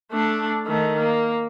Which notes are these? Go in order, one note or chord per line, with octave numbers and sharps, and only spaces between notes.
A3 D4
D#3 A3
A#3